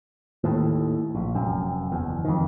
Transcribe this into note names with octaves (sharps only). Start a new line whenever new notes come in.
D#2 A2
A#1
F1 F#2
F#1 E2
F2 D#3